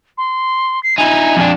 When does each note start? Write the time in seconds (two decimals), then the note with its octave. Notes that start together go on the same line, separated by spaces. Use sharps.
0.18 C6
0.83 C7
0.98 D#4 E4 G#5
1.36 F2 D4